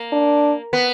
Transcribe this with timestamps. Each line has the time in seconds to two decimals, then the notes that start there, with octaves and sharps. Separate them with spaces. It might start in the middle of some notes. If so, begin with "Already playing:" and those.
Already playing: A#3
0.13 D4
0.73 B3